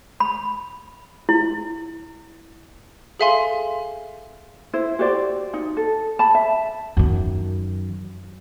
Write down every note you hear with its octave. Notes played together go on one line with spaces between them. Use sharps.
B5
E4
G#4 A4 E5 F5 G#5 C6
E4 C5
F#4 G4 C5 D5
D#4
A4
A5 B5
E5
F#2 D#3